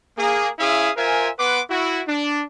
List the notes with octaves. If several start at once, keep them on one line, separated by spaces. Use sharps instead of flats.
A#3 G#4
C#4 E4 G#4 E5 F5 D#6
F4 A#4 C5 E5 G#5
B3 B4 F#5 C6 D6
E4 F#4
D4